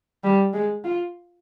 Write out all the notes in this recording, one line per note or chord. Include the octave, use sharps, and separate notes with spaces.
G3
G#3
F4